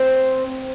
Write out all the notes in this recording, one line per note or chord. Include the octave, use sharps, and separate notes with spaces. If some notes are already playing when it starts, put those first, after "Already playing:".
Already playing: C4